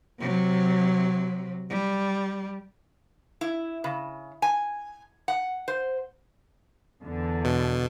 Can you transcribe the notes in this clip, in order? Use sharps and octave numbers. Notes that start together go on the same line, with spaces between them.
C3 F#3
G3
E4
C#3
G#5
F#5
C5
E2 D3
B2